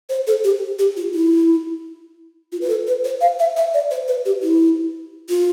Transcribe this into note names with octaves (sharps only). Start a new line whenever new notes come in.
C5
A4
G4
G4
F4
E4
F4
B4
A4
B4
C5
F5
E5
E5
D5
C5
B4
G4
E4
F4